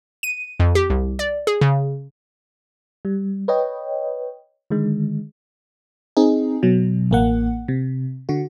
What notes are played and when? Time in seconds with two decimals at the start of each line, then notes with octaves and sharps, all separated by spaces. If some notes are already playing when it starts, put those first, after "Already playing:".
0.23 D#7
0.60 F2
0.75 G4
0.90 C2
1.19 D5
1.47 G#4
1.61 C#3
3.05 G3
3.48 B4 C#5 D#5 G5
4.70 D3 D#3 G#3
6.17 C4 D#4 G#4
6.63 B2 F#3
7.11 A1 A#3 F#5
7.68 C3
8.29 D3 F#4